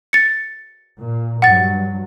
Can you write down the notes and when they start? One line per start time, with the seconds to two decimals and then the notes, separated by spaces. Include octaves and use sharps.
0.13 A6 C#7
1.01 A#2
1.42 G2 F#3 F#5 A6